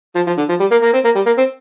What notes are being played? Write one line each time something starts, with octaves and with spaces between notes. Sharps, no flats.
F3
F3
D3
F3
G3
A#3
A#3
C4
A#3
G3
A#3
C4